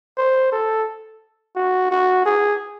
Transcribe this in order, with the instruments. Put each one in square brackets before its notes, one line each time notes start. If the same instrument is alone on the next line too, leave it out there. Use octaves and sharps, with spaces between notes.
[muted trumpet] C5
A4
F#4
F#4
G#4